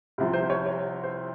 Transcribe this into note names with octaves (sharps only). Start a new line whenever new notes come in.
C2 C3 F3
C5
C#5
C#5
C5